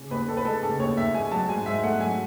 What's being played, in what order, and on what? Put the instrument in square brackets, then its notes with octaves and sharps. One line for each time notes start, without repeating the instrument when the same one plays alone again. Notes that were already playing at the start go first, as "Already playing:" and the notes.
Already playing: [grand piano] C#3
D#2 B4
D#2 A4
B4
G#3 A4
C#3 A4
D#2 C#5
D#2 E5
G#3 G#5
F#3 A5
G#2 G#5
G#2 E5
A3 F#5
F#3 G#5